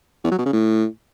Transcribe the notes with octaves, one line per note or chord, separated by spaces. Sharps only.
E2
F#3
B2
C#3
A2